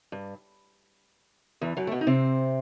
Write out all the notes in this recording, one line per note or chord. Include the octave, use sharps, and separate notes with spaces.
G2
E2 E3
F#2 F#3
A3
B2 B3
D#4
C3 C4